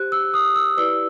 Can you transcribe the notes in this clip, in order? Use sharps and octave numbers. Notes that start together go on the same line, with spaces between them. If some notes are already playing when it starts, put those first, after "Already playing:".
Already playing: G4 C5 F#6
E6
D#6
E6
E4 G4 B4 D5 E6